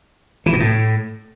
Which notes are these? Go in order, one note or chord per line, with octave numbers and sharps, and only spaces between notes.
E3
B2
A2